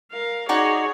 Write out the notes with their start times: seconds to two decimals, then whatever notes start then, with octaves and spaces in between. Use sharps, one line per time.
0.12 A#4 F5
0.49 D#4 F#4 G#4 C#5 D5